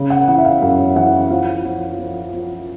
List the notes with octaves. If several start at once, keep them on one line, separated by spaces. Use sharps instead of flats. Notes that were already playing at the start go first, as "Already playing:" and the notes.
Already playing: C#3
F#5
E3 F#5
E5
F5
F#2 F5
E3 F#5
F3 F5
F3
F3
F3